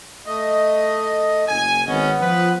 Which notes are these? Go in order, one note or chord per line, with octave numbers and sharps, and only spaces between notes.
A3 D#5
F#1 G#5
G#1 B3 C#4 D#5
F3 B4